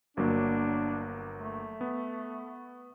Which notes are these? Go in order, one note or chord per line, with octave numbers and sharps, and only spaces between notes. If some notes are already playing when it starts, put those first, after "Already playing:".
G1 F#3 A#3 D4
A3
B3